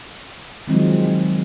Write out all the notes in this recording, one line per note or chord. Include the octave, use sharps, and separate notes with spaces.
D#3 F3 F#3 G#3 C4 D#4